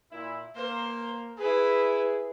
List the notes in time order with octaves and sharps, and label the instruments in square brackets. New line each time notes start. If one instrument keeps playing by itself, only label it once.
[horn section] A#2 E4
[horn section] A#3 A#4 [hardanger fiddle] C5
[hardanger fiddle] E4 B4 [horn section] G#4